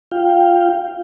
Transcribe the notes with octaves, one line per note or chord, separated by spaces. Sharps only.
F4 F5 G5